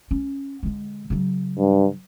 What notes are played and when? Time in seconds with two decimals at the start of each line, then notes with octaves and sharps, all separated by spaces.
0.11 C#4
0.63 D3 G#3
1.10 C#3 F#3
1.58 G2